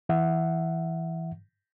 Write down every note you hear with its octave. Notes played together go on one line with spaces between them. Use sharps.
E3 E5 F#5